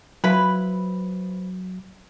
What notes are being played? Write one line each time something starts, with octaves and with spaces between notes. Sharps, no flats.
F3 F#3 E4 B4